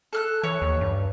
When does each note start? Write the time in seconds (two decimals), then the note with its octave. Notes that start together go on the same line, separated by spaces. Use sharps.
0.13 A4 F6 F#6
0.44 E3 C#5
0.62 D#2
0.81 G2